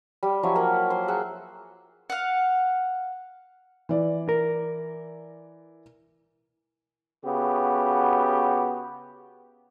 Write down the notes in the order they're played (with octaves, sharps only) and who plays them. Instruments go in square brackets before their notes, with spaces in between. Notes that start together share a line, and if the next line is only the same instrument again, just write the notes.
[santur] G3
F3 F#3 E4 C#5
A#3
C5
G#4 F#5 E6
[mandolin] F5 F#5
[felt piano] E3 D5
[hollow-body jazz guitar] A#4
[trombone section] C#3 B3 F#4 G4